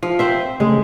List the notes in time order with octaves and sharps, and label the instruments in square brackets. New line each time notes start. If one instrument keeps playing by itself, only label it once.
[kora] F3
C4 C5 E5
[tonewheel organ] C#3 A3 [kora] G#3